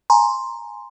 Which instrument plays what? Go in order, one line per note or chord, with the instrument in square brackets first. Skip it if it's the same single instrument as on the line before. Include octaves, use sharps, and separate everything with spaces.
[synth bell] G#5 A#5 C6